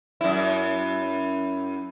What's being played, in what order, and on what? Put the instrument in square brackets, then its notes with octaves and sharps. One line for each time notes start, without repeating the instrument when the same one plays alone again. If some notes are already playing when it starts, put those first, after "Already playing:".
[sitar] F#2 E4